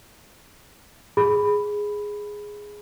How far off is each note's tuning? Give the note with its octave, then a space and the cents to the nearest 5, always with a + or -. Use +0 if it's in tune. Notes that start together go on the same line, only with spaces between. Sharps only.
G#4 +0 B5 +0